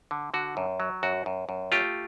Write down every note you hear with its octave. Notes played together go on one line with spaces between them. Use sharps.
D3
D3 F#4
F#2
F#3
F#2 F#4
F#2
F#2
A3 F4 G4